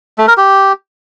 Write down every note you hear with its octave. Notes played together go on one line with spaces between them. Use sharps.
A3
A#4
G4